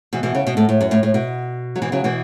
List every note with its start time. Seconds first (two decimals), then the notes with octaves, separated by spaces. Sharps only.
0.13 B2 E3
0.23 B2 E3
0.35 C#3
0.47 B2
0.57 A2
0.69 A2
0.81 F#2
0.91 A2
1.03 A2
1.14 B2
1.76 F#3
1.82 B2 E3
1.92 C#3 F#3
2.04 B2 E3